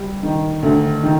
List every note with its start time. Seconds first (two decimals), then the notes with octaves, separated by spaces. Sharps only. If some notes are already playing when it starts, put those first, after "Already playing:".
Already playing: G3
0.23 D#3
0.62 D2
1.03 D#3